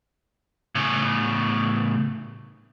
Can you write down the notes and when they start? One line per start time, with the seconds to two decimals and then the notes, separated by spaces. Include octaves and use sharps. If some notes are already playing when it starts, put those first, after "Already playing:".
0.75 A2 C#3